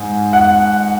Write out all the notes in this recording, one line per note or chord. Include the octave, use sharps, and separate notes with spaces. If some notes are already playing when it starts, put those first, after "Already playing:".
Already playing: G#2 G#5
F#5